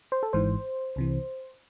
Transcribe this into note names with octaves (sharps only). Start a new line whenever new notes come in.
C5
A4
G#1 G#2 E3 C5
C2 C3 E3